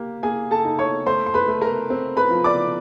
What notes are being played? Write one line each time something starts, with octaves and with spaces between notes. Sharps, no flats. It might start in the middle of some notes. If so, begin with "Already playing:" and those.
Already playing: A#3 G4
A#3 G#4 G#5
A4 A5
D#4
C#5 C#6
A3 C5 C6
C6
B4 B5
A3
A#4 A#5
C4
B4 B5
F3
D5 D6